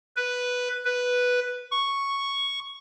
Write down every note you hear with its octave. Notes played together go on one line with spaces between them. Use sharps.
B4
B4
C#6